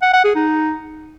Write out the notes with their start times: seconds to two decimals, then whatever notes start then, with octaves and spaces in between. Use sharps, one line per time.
0.02 F#5
0.13 F#5
0.24 G#4
0.35 D#4